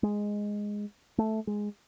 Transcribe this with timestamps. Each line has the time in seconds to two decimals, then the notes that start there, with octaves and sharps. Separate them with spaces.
0.03 G#3
1.18 A3
1.47 G#3